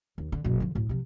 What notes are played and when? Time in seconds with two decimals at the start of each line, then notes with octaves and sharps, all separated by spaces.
0.18 D#2
0.32 D3
0.44 F#1 B2
0.60 D3 F3
0.75 D2 A2
0.89 C3 F3